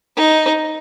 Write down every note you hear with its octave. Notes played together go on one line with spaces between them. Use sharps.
D#4